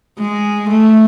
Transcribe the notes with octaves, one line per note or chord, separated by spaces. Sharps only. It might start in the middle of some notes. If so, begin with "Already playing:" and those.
G#3
A3